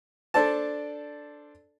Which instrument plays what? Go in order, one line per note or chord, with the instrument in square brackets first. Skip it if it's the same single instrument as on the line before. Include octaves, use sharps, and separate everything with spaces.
[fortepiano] D4 A4 C5 D5 A5